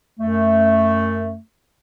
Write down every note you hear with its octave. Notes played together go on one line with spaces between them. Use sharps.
F#2 A3